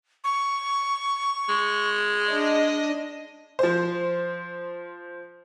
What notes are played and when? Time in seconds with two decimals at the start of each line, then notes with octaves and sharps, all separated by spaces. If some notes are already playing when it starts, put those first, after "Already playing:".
0.24 C#6
1.49 G#3
2.28 D4 D#5
3.59 F3 C5